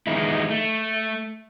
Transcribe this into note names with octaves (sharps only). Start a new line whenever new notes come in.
D#3 E3 G#3 B3 D#4 E4
A3